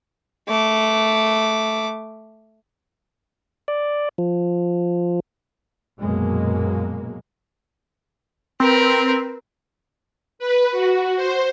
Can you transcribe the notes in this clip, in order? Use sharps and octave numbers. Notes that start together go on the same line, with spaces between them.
A3 D6
D5
F3
A#1 F#2 B2 G#3 A#3
C4 A#4 B4
B4
F#4
C5